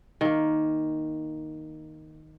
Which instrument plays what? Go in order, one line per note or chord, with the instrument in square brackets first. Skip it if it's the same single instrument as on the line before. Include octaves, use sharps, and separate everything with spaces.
[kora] D#3 A#3